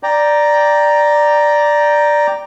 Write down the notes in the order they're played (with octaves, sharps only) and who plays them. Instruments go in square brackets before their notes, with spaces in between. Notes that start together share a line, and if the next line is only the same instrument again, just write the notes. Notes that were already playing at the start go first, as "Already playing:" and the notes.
[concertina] D5 G5 A#5